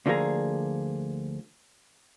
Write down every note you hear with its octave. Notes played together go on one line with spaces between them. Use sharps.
D2 D3 F3 A#3 G#4 A#5